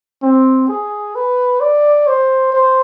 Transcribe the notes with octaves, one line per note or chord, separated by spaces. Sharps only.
C4
G#4
B4
D5
C5
C5